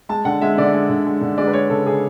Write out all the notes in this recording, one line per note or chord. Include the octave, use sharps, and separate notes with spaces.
G#3 A5
D3 F#5
G#3 E5
D3 D5
G#3
D3
G#3
D3
G#3 D5
B4
G#3 C#5
C#3 A4
C#3 G#4